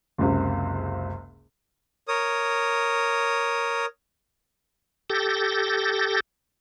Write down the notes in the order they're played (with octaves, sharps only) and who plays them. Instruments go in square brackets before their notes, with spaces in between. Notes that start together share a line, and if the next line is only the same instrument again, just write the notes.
[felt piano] F#1 C#2 C3
[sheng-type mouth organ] A#4 C#5 D#6
[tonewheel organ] G4 A4 G6 A6 A#6